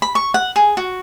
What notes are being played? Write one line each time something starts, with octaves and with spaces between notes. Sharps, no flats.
B5
C#6
F#5
G#4
F#4